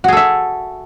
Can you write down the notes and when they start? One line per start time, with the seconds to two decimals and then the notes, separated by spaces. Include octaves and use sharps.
0.04 F#4
0.08 G#4
0.13 A4
0.17 E5